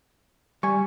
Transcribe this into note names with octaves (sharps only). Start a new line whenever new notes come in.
G3 G#5 C#6